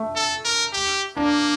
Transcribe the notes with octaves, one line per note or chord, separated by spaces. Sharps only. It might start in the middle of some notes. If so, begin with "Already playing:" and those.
Already playing: A3
A4
A#4
G4
A#3 D4